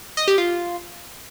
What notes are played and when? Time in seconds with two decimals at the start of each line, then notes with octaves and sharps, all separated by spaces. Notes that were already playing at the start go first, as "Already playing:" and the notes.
0.17 D#5
0.28 G4
0.38 F4